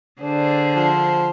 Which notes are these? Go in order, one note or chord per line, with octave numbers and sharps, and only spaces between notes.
D3 D4 G#4 C5
F3